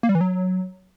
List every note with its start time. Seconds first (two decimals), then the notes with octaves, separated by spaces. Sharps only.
0.03 A#3
0.09 G3
0.15 E3
0.21 F#3